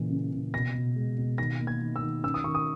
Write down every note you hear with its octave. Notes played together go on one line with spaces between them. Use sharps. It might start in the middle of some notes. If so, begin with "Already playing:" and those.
Already playing: A#2 C#3 E3
C#3
C#3
B2 A#6
B2
G#3
B2
D#3 A#6
A#3
G#6
D#3
E6
D#3
C#4 E6
D#6
D#3 C#6
D#6